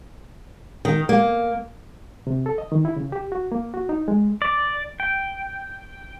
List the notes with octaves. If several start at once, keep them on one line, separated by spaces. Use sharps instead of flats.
D#3
A#3
C3
A4
D#5
D#3
E4
C#3
G4
F#4
A#3
F#4
D#4
G#3
D5
G5